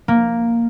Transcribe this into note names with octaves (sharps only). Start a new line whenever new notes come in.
A#3